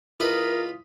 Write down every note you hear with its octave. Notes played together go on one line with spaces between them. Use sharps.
C#2 E4 F4 A#4 B4 D#5 D#6 B6